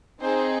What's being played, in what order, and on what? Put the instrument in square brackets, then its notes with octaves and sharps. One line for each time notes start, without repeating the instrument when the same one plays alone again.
[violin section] C4 D#4 G#4 C5